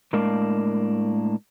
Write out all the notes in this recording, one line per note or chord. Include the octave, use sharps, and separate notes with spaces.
A2 G#3 A#3 D4 A#4 F5